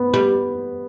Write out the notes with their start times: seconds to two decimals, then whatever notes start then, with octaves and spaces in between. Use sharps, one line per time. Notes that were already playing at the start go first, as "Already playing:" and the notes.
Already playing: B3
0.14 G3